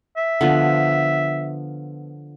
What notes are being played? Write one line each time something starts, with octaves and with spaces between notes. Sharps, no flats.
E5
D3 F3 B3